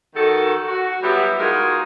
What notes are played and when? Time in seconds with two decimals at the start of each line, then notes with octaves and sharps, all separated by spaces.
0.16 D#3 F#4 A4
0.67 F#4
1.02 F#3 G3 B3 E4 G4
1.40 G#3 D#4 F4 F#4 G#4 A#4